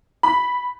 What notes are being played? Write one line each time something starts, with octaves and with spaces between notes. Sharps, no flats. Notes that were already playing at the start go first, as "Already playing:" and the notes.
B5